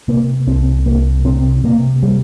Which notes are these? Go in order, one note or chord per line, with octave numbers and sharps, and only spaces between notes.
C3 A#3
C2 C4
C2 A#3
C3 C4
C3 A#3
G3